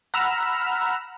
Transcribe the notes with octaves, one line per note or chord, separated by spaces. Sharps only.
F#5 A#5 B5 E6 F6